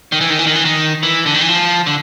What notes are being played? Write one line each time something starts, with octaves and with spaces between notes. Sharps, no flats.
D#3
E3
D#3
E3
D#3
E3
D#3
E3
D3
D#3
E3
F3
D3